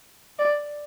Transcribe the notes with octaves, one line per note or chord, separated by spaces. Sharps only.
D5